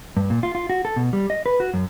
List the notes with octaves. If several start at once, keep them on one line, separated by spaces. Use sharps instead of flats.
G2
A#2
F4
F4
F#4
A4
B2
G3
D#5
B4
F#4
F#2